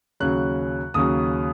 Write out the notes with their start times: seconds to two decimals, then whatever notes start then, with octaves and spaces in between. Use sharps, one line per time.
0.20 D#2 C#3 F#3 F#6
0.94 D#2 C#3 F#3 D#6